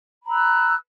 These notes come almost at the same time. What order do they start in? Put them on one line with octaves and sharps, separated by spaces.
B5 A#5 E6 F#6